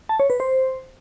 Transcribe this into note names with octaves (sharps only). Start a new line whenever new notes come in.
A5
C#5
B4
C5